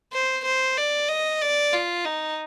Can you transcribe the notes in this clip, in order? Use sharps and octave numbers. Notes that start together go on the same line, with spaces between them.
C5
C5
D5
D#5
D5
F4
D#4